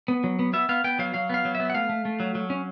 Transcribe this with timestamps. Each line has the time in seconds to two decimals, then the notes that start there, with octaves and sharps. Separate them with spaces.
0.08 B3
0.24 F#3
0.39 B3
0.53 B3 E5
0.69 B3 F5
0.84 B3 G5
0.99 F#3 F5
1.14 F#3 F5
1.30 B3 F5
1.45 F#3
1.55 E5
1.60 B3
1.70 F#5
1.75 A3 F5
1.89 A3
2.05 A3
2.20 F#3
2.35 F#3
2.50 C#4